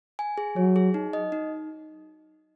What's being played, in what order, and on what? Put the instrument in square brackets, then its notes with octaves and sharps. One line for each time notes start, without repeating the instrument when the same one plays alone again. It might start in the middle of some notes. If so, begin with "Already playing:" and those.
[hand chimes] G#5
G#4
[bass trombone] F#3 [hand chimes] C#5
[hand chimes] G#4
D#4
D#5
D#4